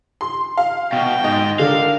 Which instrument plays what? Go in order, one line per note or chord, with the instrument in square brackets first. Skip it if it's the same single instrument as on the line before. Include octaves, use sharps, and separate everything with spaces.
[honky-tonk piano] C6
F5
[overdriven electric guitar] B2 [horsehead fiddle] G5
[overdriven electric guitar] G#2 [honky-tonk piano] D#5
[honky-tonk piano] D3 [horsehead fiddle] D4 A#4 [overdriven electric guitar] F5